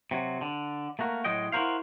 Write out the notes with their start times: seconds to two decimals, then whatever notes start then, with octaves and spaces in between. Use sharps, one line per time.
0.11 C3 F#3
0.41 D3
0.99 A3 A#3 F#4 A#4
1.24 A2 F#3 G#3 D#5 G5
1.52 E4 F#4 G#4 A#4 C5 F5